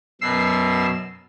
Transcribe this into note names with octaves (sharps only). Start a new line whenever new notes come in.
F#2 B2 E6 C7